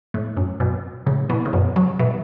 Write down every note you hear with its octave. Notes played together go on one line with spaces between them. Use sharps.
A2
F#2
F#2 B2
A2 C#3
B2 E3
C#3
F#2 B2
C#3 F#3
B2 E3